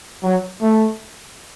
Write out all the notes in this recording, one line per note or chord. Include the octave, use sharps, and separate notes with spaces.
F#3
A3